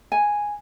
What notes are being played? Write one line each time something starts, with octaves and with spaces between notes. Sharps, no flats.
G#5